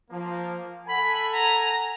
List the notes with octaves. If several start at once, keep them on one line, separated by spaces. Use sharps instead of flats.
F3 A#3
A4 F#5 G#5 B5
A#5